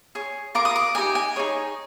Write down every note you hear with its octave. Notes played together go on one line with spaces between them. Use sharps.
G#4 C#5
F4 A#4 D6
D#6
D6
D#4 G4 A#4 D#5 G#5
G#5
D#4 G#4 C#5